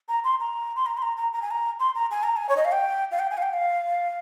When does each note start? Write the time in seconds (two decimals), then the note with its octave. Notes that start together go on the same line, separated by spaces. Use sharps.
0.09 A#5
0.24 C6
0.40 A#5
0.76 C6
0.86 A#5
0.97 C6
1.02 A#5
1.17 A#5
1.33 A#5
1.42 G#5
1.51 A#5
1.80 C6
1.95 A#5
2.11 G#5
2.23 A#5
2.37 G#5
2.49 C#5
2.57 D#5
2.65 F5
2.72 G5
3.11 F5
3.19 G5
3.31 G#5
3.37 F5
3.42 G5
3.54 F5